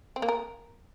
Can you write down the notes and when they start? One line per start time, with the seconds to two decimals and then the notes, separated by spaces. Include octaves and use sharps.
0.16 C4
0.22 A#3
0.28 A#4